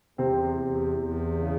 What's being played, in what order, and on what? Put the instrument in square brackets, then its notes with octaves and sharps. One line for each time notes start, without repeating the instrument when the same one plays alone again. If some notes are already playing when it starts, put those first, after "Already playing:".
[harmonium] E2 [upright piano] C3 C4
[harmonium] E2
E2
C#3